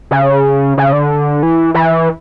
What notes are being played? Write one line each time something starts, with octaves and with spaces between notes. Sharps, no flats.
C#3
C#3
D3
E3
E3